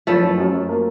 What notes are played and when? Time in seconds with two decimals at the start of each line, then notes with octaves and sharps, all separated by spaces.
0.07 F#1 F3 A3
0.23 F#1
0.38 F#2
0.53 F#2
0.69 A#3